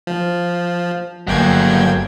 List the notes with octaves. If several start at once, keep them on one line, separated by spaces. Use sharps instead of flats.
F3
G1 F#3 A#3 G5 G#6